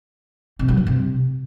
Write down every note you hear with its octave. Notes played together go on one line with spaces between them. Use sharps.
C3
F#3
G2
C3